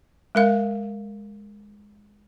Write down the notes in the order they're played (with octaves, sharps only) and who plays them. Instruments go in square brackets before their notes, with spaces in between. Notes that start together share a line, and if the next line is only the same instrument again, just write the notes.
[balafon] G#3 A#4 F5